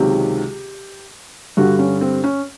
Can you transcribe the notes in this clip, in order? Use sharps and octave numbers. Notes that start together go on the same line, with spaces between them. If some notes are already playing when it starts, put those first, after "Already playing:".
Already playing: C#2 C3 D#3 F#3 G4
G2 D3 G3 F#4
C#4
C4
C#4